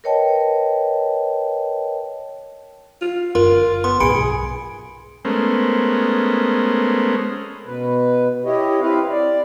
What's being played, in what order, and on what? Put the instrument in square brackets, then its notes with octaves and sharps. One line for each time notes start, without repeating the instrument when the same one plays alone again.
[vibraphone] A#4 B4 C#5 D#5 G5 A5
[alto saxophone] F4
[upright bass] F#1 D2 [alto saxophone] F4 [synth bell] A#4 C6
[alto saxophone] B3 [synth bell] C6
[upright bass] B1 G#2 [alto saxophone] G#4 [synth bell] B5 C#7 D7
[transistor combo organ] G#3 A3 B3 C#4 A#4 C5
[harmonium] B2 B4
E4 G4 C#5 D#5
C4 E4 B4 F5
D5